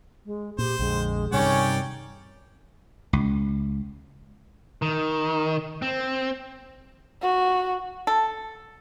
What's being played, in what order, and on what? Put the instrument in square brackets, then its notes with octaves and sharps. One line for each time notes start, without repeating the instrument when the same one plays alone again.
[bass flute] G#3
[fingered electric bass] A#2 [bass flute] G4 [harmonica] C5
[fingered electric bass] A#1 F2 D3 [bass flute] G#3
[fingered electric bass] G2 C3 G3 [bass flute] D#3 [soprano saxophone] C#4 [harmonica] C#5 D5 G5
[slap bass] C#2
[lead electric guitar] D#3
C4
[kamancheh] F#4
[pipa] A4